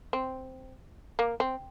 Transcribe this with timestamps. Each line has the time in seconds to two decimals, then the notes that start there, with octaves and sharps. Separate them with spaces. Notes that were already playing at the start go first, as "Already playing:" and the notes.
0.13 C4
1.19 A#3
1.40 C4